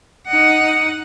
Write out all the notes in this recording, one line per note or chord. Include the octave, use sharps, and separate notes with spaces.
D#4 F#5